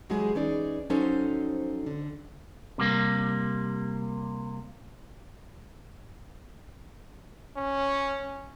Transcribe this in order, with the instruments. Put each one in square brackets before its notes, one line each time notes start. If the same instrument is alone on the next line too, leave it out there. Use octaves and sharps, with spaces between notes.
[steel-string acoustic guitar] E3 F#3 G#3 E4 G4 G#4
E3 C#4 D#4 G#4 D5
F3 F#3 C#4 D#4 A4 C5
D3
[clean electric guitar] C3 G3 A#3
[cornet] C#4